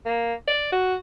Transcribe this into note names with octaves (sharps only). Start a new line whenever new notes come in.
A#3
D5
F#4